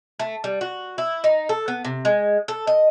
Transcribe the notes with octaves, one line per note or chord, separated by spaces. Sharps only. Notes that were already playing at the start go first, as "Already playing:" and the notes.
A3
G3
F#4
E4
D#4
A4
B3
C3
G#3
A4
D#5